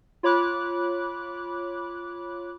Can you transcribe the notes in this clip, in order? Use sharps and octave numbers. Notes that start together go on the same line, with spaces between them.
F4 C#5 B5 D6 F#6